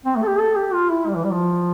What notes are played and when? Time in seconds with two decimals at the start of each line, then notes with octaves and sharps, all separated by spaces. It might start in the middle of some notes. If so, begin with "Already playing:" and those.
0.05 C4
0.16 A3
0.23 A4
0.27 G4
0.40 A4
0.56 G4
0.73 F4
0.89 E4
1.07 G3
1.16 E3
1.24 G3
1.33 F3